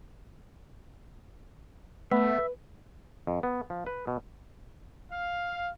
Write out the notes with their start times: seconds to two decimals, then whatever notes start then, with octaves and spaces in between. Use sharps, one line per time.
2.11 A3 B3 B4 E5
3.27 F2
3.43 B3
3.70 F3
3.86 B4
4.07 B2
5.10 F5